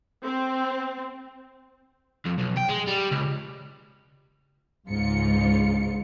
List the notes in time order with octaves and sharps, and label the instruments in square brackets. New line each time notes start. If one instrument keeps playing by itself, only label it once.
[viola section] C4
[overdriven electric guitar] F2
B1
G5
G#3
G3
C#2
[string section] C#2 G#2 C#3 F4 C#7